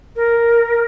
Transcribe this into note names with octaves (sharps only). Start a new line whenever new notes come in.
A#4